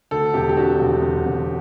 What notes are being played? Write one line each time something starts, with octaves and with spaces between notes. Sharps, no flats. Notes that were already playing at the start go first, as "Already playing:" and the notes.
D2 A4
E1 G4
G4
D3 F#4
E1
E1
E1